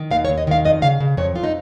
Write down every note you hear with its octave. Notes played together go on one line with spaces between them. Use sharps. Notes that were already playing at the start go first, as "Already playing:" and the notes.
Already playing: D#3
D#2 F5
C#5
D#2
D#5
D#3 F5
F2 D#5
C#3 F5
C#3
F2 C#5
F2 F4
D#4